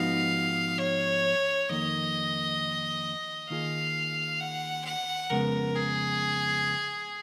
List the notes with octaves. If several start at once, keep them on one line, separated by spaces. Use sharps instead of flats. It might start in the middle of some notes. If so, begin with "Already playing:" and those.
Already playing: G#2 F3 B3 D#4 F#4 F5
C#5
F2 D#3 A#3 D#5
D#3 A#3 F4 G#4 F5
F#5
F#5
F2 C#3 G#3 B3 A#4
G#4